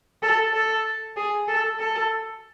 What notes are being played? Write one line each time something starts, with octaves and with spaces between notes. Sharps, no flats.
A4
A4
G#4
A4
A4